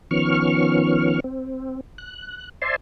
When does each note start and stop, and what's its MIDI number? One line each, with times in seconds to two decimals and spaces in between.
0.11 1.20 51
0.11 1.20 53
0.11 1.20 59
0.11 1.20 61
0.11 1.20 85
0.11 1.20 89
1.24 1.81 60
1.98 2.49 90
2.62 2.76 72
2.62 2.76 74
2.62 2.76 76
2.62 2.76 80
2.62 2.76 81
2.62 2.76 84